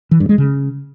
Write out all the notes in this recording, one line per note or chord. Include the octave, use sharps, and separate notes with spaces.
E3
G2
G#3
C#3